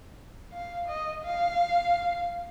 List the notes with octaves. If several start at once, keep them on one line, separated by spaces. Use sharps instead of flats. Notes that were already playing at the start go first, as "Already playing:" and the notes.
F5
D#5
F5